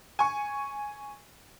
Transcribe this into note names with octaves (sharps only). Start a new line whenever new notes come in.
G#5 C#6